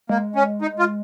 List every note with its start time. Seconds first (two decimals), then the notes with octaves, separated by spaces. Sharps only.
0.09 G#3 A#3
0.36 C#4
0.62 D#4
0.79 F4